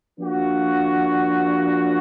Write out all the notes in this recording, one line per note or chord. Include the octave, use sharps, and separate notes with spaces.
F3 A#3 D4 F#4